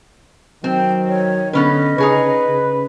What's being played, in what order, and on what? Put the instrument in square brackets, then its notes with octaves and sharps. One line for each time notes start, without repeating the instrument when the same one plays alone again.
[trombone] D#3 [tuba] F#3 [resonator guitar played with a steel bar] C4 [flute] G5
[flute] C#5
[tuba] D3 [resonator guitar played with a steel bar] B3 C#4 B4 [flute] D#5
[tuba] C#3 [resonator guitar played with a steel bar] D#4 G#4 C#5 [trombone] B4
[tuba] C#3